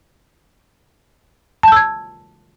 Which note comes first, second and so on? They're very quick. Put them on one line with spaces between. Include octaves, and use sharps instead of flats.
A5 G6 E6 G#6